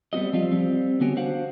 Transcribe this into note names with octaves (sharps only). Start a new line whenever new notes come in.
G3 B3 C4 F#4 D#5
F3 G3 C4 F4
G3 C4
D3 B3 C#4 F#4 G4
D4 F#4 C5 F5 F#5